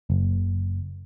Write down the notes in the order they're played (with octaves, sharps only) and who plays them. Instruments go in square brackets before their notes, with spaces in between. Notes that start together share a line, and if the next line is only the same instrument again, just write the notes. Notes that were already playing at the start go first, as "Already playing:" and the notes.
[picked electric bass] F#1